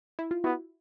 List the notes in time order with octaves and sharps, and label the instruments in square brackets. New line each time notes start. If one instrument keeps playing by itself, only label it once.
[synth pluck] E4
F4
[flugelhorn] B3 [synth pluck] E4 F#4